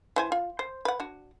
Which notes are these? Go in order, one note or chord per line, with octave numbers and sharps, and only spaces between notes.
E3 C5 G#5
F4
C5
B4 F#5
D4 F#4